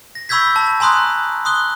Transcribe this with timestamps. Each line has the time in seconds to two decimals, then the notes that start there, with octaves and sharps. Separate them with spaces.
0.15 A#6
0.29 B5 C#6 E6 G6 G#6 B6
0.56 A5
0.80 G#5 A#5 C6 D#6 F#6
1.45 C6 D#6 F#6 G7